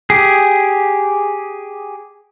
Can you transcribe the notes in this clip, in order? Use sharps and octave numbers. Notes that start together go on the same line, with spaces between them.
G4 G#4